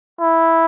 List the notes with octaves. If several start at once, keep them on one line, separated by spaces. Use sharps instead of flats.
E4